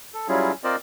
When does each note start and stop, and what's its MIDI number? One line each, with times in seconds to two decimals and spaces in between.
0.14 0.27 69
0.28 0.52 54
0.28 0.52 55
0.28 0.52 61
0.28 0.52 64
0.28 0.52 65
0.28 0.52 68
0.64 0.76 60
0.64 0.76 65
0.64 0.76 70
0.64 0.76 72
0.64 0.76 74
0.64 0.76 75